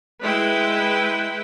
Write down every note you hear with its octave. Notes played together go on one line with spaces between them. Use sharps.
G#3 E4 B4 G5